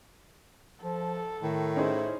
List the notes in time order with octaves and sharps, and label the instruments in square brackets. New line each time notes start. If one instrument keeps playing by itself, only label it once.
[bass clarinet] F3 [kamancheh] A4
[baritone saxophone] A2 [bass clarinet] D#3
[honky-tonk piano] C#4 D#4 G#4 [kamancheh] E4 C5